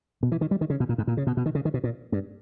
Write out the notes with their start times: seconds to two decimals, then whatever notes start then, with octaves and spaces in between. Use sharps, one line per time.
0.23 B2
0.32 E3
0.41 D#3
0.51 G3
0.61 D#3
0.70 C#3
0.80 B2
0.89 A#2
0.98 G#2
1.07 A#2
1.17 C#3
1.27 B2
1.37 B2
1.46 D#3
1.55 C#3
1.65 D#3
1.74 B2
1.84 A#2
2.12 G2